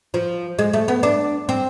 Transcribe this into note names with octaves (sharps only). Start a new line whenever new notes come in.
F3
G#3
A3
B3
D4
C4